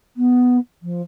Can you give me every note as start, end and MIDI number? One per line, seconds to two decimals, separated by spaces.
0.16 0.57 59
0.82 1.01 53